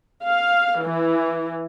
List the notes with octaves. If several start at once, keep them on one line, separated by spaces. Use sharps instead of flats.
F5
E3